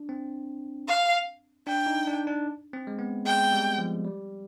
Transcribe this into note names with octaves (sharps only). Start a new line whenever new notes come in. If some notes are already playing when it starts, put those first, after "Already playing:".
Already playing: D4
C4
F5
D4 G5
D#4
D4
D4
C4
G#3
B3
G#3 G5
G3
F3
G3